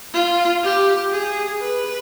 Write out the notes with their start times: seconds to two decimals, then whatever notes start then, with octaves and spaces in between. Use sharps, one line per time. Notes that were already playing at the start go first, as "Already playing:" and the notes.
0.14 F4
0.63 G4
1.12 G#4
1.61 B4